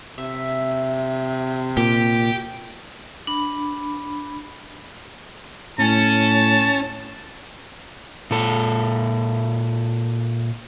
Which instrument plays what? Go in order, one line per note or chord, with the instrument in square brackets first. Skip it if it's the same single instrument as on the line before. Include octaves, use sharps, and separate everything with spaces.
[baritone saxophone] C3 [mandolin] E5
[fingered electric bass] A#2 [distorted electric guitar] G4
[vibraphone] D4 B5
[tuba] A2 [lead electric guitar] C#4 [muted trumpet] A5
[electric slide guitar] A#2 A4